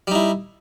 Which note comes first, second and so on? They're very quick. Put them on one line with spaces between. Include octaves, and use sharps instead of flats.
G3 D#4 E4